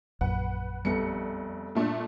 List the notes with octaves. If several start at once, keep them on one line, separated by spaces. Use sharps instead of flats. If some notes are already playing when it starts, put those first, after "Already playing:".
A#1 F#2 B4 F#5
F1 G3 B3 A4 C#7
A#2 A3 D4